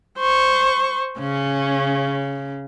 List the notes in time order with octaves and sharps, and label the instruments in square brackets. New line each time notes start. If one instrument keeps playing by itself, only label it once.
[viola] C5 C#6
[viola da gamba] C#3 [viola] C#4